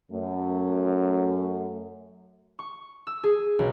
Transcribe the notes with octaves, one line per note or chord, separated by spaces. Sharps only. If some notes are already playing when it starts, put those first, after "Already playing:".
F#2 A3
C#6
E6
G#4
B1